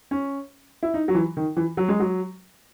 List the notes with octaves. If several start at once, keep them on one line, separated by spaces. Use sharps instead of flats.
C#4
E4
D#4
F#3
E3
D#3
E3
F#3
G#3
F#3